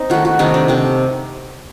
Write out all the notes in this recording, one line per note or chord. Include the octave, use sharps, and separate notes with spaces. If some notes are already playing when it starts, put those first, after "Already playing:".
Already playing: C4 D#4
D#3 A3 F#4
F#4
C3 D#3 A3 D#4
D4
C3 D#3 A3